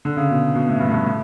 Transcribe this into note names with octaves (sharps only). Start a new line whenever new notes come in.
D3
C#3
B2
B2
A2
G2
A2
G2
A2